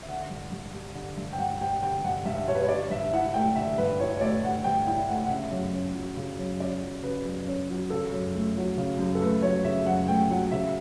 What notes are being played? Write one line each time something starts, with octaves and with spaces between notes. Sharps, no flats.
E5
D3 F#5
G2
G2
G3
D3
G2
G5
G2 F#5
G3 G5
D3 G5
G2 F#5
G2 E5
G3 C#5
B4
C#5
D3 D5
G2 E5
E4 F#5
A3 G5
D3 E5
G2 B4
E4 C#5
C#5
A3 D5
D3 F#5
G2 G5
E4 G5
A3 F#5
F#5
C#3 E5
F#2
C#4
F#3
C#3
F#2
C#4 D5
F#3
C#3 B4
F#2
C#4
F#3
C#3 A4
F#2
A3
F#3
C#3
F#2
A4
A3 B4
F#3 C#5
C#3 E5
F#2 F#5
A3 G5
F#3 F#5
C#3 E5